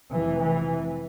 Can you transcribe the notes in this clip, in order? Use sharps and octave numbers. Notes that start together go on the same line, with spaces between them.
F1 F2 C3 E3
E3